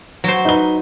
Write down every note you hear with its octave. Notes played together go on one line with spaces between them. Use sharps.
F#3 C5
D#4 B4 G7